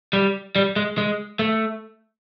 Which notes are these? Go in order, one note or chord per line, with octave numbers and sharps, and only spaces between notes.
G3
G3
G#3
G#3
A3